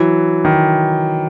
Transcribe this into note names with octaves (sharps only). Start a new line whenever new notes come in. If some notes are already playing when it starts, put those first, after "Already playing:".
Already playing: E3 F#3
D#3